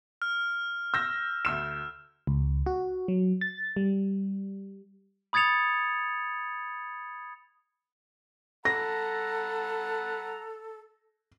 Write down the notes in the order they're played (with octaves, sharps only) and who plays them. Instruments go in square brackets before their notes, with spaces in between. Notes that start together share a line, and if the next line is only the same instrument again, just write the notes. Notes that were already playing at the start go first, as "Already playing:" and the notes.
[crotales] F6
[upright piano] E6 G6 A#6
D2 E6 E7
[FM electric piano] C#2
F#4
F#3
A6
G3
[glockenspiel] B5 D#6 G#6 A6 C#7 F7
[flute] A4 [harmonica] F#5 A#5 B5 [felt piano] A#6